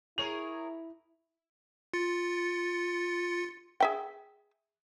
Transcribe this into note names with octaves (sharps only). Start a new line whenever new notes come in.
E4 G#4 A#4 C#5 F7
F4 A6 C#7
G#4 E5 G5